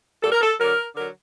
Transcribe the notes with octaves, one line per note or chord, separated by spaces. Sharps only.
A#2 G3 A4
A#4
A4
D3 F#3 A#4
D3 F#3 A#4